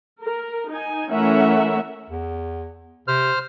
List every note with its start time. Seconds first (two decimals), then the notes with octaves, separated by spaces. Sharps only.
0.22 A#4
0.70 D#4 G#5
1.10 E3 A3 C#4 A#4 E5 F#5
2.10 E2
3.08 C3 C5 F6